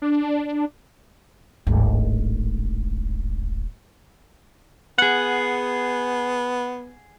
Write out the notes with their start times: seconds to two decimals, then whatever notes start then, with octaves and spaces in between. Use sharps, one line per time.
0.02 D4
1.67 D1 G#1
4.98 B3 G#4 F#5